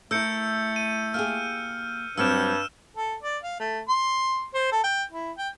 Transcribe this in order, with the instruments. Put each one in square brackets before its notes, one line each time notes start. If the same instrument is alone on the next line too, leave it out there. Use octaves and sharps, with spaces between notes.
[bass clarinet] A3 [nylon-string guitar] E4 A#4 [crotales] E6 G6 C#7
[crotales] D#7
[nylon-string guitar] A#3 G4 G#4 [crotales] F6
[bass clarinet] G2 [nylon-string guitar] F#3 G3 C4 [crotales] E6 F6 E7
[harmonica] A4
D5
F5
A3
C6
C5
A4
G5
E4
G5